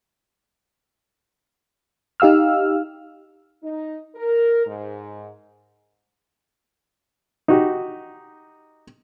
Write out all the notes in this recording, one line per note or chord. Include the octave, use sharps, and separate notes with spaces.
D#4 G4 F5 E6 F6
D#4
A#4
G#2
D#4 F#4 G4